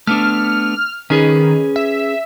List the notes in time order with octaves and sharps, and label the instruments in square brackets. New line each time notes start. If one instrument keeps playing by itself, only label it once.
[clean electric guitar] A3 B3 D4 [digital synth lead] F6
[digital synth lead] D#3 [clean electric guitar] C#4 G#4 B4
[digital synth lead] E5